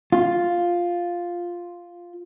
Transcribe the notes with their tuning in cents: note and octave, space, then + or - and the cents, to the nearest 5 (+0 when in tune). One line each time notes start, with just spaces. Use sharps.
F4 +0